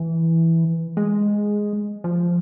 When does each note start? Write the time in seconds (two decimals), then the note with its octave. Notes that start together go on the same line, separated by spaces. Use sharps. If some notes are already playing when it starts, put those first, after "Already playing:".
Already playing: E3
0.97 G#3
2.04 F3